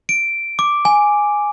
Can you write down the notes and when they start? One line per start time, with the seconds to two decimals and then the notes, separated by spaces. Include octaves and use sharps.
0.09 D7
0.59 D6
0.85 G#5